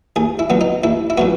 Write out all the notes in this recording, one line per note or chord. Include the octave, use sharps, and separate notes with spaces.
D#2 G#4
E4
C#3 F#3 B3
D#4
D#2 E4
E4
C#3 F#3 B3 F#4